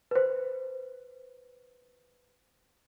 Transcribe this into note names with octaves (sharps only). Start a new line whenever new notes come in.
B4 C5